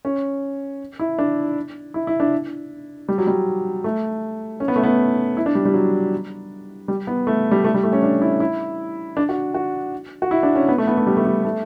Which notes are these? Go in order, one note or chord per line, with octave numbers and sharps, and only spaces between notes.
C#4
E4
D4
E4
E4
D4
G3
F#3
G3
A3
C#4
B3
A3
B3
E4
D4
G3
G3
F#3
G3
B3
A3
G3
A3
G3
A3
C#4
D4
E4
E4
D4
F#4
F#4
F#4
E4
D4
C#4
B3
A3
B3
A3
G3
A3
G3
A3